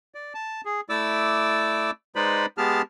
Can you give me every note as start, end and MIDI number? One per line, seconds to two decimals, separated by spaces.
0.15 0.33 74
0.34 0.61 81
0.65 0.81 68
0.89 1.91 57
0.89 1.91 64
0.89 1.91 74
0.89 1.91 86
0.89 1.91 88
2.16 2.46 56
2.16 2.46 63
2.16 2.46 71
2.16 2.46 72
2.16 2.46 74
2.16 2.46 83
2.58 2.82 56
2.58 2.82 59
2.58 2.82 67
2.58 2.82 68
2.58 2.82 81
2.58 2.82 89